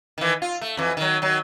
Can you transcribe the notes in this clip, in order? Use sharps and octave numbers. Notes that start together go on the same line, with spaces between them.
D#3 E3
F4
A3
F2 E3
D#3 F#3
D#3 F#3